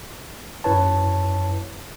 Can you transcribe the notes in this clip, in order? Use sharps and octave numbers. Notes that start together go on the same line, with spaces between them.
F#2 E4 B4 C#5 A5